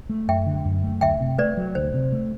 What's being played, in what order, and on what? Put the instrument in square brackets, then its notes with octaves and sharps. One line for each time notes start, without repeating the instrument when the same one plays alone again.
[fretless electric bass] A3
[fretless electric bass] F#2 [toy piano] E5 G5
[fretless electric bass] D3
F#2
A3
[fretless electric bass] D2 [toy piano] E5 G5
[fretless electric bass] C3
[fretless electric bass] A3 [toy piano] B4 D5
[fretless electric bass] F#3
[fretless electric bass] D2 [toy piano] C5
[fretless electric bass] C3
A3